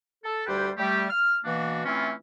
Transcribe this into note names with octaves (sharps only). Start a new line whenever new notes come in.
A4
D2 G3 G4 B4 C5 G5
G3 A3 G4
F6
B2 E3 A#3 D4 F#4
E3 A3 C4 C#4 E4 F4